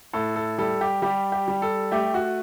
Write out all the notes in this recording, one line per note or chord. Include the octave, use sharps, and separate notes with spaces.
A2 A4
A4
G3 A4
G4
G3 G4
G4
G3
A4
A3 G4
F#4